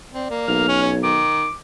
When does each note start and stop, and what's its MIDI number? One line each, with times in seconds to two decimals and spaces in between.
0.13 0.27 60
0.13 0.48 74
0.30 0.65 58
0.48 1.23 35
0.48 0.79 89
0.68 0.92 61
0.82 0.97 73
1.03 1.48 51
1.03 1.54 86